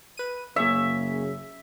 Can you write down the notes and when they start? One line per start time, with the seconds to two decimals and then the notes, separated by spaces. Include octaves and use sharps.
0.17 B4 D#7
0.56 F#1 C#3 A#3 G#4 C#5 E5